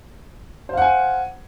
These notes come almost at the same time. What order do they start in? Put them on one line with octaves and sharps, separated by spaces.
C5 F5 F#5 G#5